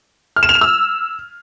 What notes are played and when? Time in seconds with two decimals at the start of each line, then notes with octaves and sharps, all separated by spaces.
0.36 F6
0.43 E7
0.49 F7
0.55 E7
0.61 E6